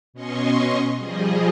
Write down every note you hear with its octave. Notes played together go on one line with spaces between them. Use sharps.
B2 C#4 D#5 C6 C#6
F3 G3 G#4 D#5